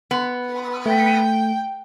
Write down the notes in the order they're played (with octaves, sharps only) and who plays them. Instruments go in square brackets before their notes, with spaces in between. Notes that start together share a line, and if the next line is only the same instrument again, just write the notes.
[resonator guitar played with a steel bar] B3
[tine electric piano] A3 [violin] G5